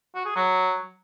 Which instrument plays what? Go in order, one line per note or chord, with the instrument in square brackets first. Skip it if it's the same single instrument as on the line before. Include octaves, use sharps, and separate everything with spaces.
[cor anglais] F#4
G#4
F#3